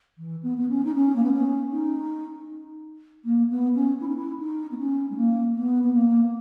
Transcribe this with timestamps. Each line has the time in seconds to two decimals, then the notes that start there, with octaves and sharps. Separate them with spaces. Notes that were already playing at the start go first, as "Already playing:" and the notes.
0.18 E3
0.43 B3
0.57 B3
0.69 C#4
0.84 D#4
0.94 C#4
1.15 A#3
1.23 B3
1.32 C#4
1.71 D#4
3.24 A#3
3.49 B3
3.75 C#4
4.00 E4
4.08 D#4
4.15 E4
4.39 D#4
4.71 B3
4.78 C#4
5.10 G#3
5.16 A#3
5.55 B3
5.83 B3
5.93 A#3